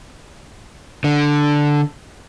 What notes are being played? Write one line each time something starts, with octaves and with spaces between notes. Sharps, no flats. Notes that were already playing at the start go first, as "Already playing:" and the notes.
D3